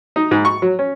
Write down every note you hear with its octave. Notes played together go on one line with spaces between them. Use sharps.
D#4
G#2
C#6
F#3
C#4